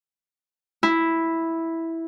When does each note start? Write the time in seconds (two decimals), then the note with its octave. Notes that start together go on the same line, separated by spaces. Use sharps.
0.83 E4